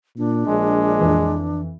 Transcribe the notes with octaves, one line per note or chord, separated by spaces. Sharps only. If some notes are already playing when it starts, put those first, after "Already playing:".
A#2 D4
A#1 G#3
F2 E3